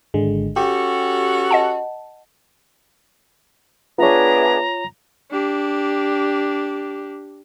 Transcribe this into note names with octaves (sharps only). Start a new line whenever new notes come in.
G#1 D3 G#3
C#4 F#4 G4 A4
D#5 F#5 A5
B3 D4 F4 G#4 C#5 E5 A#5
D4 G4